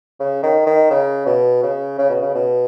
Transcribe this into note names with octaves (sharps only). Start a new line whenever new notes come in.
C#3
D#3
D#3
C#3
B2
C#3
C#3
B2
C#3
B2